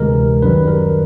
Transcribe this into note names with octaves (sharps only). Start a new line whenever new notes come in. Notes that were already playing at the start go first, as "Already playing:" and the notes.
Already playing: D2 C3 E3 G#3 A#4
F#2 D#3 G3 B4
A#4